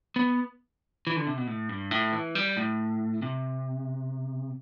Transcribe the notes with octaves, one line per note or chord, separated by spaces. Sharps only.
B3
E3
D3
C3
B2
A2
G2
A2
E3
G3
A2
C3